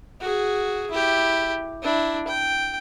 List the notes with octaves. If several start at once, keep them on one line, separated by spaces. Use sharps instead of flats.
F#4 G#4
E4 G4
D4 E4
G5